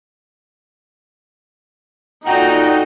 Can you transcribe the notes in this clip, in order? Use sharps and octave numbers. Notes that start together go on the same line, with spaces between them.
A#2 D#4 F#4 A4 F#5 G5 A#5